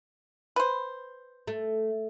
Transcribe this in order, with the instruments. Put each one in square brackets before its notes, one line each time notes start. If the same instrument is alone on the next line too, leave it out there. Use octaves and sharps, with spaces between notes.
[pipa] B4 C5
[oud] A3